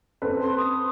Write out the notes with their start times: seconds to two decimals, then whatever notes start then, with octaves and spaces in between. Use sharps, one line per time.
0.22 C4 A4 B4
0.41 C6
0.58 D#6